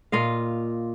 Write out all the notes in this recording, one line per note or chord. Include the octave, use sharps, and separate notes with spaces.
A#2 F4 D#5 F5